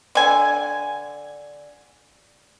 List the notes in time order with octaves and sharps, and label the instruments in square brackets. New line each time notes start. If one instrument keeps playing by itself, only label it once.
[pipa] D3 G#5